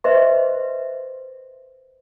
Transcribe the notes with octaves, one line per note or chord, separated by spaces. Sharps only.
B4 C5 D#5 E5 C6